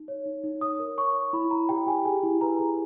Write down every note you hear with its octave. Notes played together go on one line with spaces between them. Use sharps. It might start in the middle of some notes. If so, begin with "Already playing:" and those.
Already playing: D#4
C#5
D#4
D#4
C#5 D#6
A#4
C#5 C#6
C#5
E4 B5
E4 A#5
G4 G5
G4 G#5
G#4 G#5
E4
B4 A#5
G#4